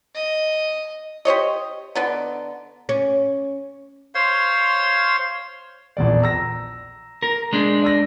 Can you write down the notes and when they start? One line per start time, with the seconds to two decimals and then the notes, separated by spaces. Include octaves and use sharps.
0.15 D#5
1.25 G4 C5 C#5 D#5
1.95 D3 B3 D#4
2.89 C#4
4.15 C5 C#5 F5 C6
5.97 A#1 E2 D5
6.22 A#5 E6 A#6
7.23 A#4
7.53 G#3 D4
7.83 D5 E6 A#6